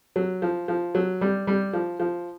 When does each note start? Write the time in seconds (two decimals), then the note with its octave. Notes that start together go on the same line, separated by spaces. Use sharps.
0.16 F#3
0.42 F3
0.68 F3
0.95 F#3
1.21 G3
1.47 G3
1.73 F3
2.00 F3